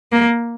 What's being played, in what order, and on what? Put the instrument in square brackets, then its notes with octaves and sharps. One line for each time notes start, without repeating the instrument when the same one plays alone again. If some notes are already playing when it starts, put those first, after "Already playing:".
[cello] A#3